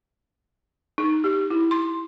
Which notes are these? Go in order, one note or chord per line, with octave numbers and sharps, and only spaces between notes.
D#4
G4
E4
C6